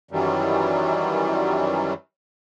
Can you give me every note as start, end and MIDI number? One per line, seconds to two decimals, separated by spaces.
0.11 1.93 42
0.11 1.93 51
0.11 1.93 52
0.11 1.93 54
0.11 1.93 55